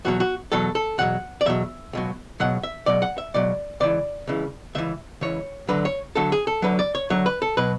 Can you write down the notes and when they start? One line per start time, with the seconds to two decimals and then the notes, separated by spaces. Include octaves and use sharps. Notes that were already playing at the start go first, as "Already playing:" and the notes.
0.05 E2 B2 F#3 F#4
0.20 F#4
0.52 E2 B2 F#3 A4
0.75 A4
0.98 E2 B2 F#3 F#5
1.41 D5
1.46 E2 B2 F#3 E5
1.93 C#2 B2 F#3
2.40 C#2 B2 F#3 F#5
2.63 E5
2.86 C#2 B2 F#3 D5
3.02 F#5
3.18 E5
3.34 C#2 B2 F#3 D5
3.80 C#2 C#3 E3 D5
4.27 C#2 C#3 E3
4.75 C#2 C#3 E3 E5
5.21 C#2 C#3 E3 C#5
5.68 D2 D3 F#3 B4
5.85 C#5
6.15 D2 D3 F#3 A4
6.32 G#4
6.47 A4
6.62 D2 D3 F#3 B4
6.79 D5
6.95 C#5
7.10 D2 D3 F#3 C#5
7.26 B4
7.42 A4
7.57 B2 F#3 B4